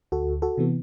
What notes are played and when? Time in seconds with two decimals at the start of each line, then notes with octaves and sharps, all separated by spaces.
0.12 D2 F#4 A4
0.42 F#4 A4
0.58 C3 E3 B3